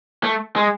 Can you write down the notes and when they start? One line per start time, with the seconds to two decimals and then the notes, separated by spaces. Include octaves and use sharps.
0.23 A3
0.56 G#3